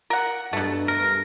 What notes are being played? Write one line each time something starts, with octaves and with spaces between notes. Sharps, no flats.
A#4 F#5
G2 B2 A3
A#4